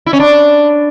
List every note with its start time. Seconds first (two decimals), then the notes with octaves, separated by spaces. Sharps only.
0.06 E4
0.13 C#4
0.20 D4